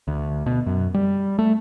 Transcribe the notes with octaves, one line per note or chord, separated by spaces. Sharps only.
D2
B2
F#2
G3
A3